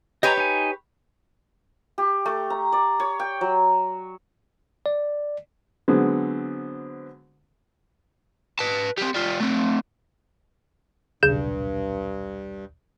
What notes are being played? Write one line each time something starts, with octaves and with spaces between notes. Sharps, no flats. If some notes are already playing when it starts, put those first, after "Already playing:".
G4 B4 C#5 D#5 G#5 A#5
D#4 G#5
G4
A3
A#5
D5
C#5
G5
F#3
D5
D3 F#3 G#3 B3 C4
B4 A5
G3 C4
G3 F4
A3 C4
D#1 B1 G2 C#3 G6 E7